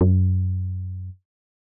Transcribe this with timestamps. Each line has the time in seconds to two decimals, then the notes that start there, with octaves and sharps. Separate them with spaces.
0.01 F#2